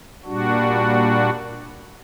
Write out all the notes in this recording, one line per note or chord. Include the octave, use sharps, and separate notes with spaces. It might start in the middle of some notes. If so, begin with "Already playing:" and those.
A#2 G3 D4 F#4